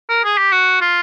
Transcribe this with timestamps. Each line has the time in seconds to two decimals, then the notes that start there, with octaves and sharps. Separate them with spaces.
0.09 A#4
0.24 G#4
0.38 G4
0.52 F#4
0.81 F4